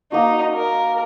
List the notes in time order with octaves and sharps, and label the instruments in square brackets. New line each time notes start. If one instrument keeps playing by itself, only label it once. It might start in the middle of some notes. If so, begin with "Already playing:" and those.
[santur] A#3 F#4 [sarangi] D#4
[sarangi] A#4